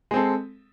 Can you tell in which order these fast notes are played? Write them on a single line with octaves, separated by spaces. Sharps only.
G#3 C4 A4